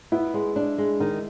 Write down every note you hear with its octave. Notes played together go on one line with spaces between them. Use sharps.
B3 E4
G#3
D4
G#3
D#3